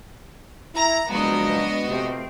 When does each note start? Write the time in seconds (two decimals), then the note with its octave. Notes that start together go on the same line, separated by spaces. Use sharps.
0.75 E4 A#5
1.08 F#1 F3 G#3 B3 D4 F#4 D#5 A#5
1.88 C3 F3 A3 C4